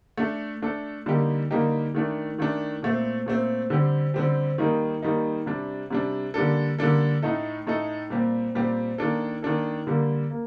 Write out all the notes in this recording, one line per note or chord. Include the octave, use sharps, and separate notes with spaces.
A3 D4 A4
A3 D4 A4
D3 G3 A#3 D#4 G4
D3 G3 A#3 D#4 G4
D#3 A3 D4
D#3 A3 D4
A#2 A3 C4
A#2 A3 C4
D3 G3 C4 G4
D3 G3 C4 G4
D#3 G3 A#3 D#4
D#3 G3 A#3 D#4
C3 G3 D4
C3 G3 D4
D3 G3 A#3 D4 A4
D3 G3 A#3 D4 A4
A2 A3 D#4 A4
A2 A3 D#4 A4
A#2 G3 C4 G4
A#2 G3 C4 G4
D#3 A#3 D4 A4
D#3 A#3 D4 A4
D3 G3 A#3
A#3